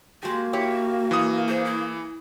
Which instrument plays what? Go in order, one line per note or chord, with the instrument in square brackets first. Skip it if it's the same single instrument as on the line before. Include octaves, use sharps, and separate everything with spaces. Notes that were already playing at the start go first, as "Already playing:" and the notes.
[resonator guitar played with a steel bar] G#3 G4 [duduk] A#3 [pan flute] F#4
[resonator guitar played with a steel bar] E4 G4 C#5
[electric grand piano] E3 D#6
[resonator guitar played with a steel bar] G#4 [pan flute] C5
[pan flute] E4